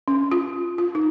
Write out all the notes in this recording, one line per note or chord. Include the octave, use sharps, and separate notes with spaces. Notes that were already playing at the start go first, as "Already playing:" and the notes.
C#4
F4
F4
D#4